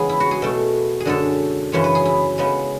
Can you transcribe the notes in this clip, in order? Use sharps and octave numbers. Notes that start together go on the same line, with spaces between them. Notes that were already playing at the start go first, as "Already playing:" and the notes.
Already playing: E2 C#3 G#3 B3 G#4
E4
F#4
G#4
B2 A3
G#4
F#2 D3 G#3 A4
F#2 C#3 E3 G#3 C#5
B4
G#4
E4
C#3 G#3 B3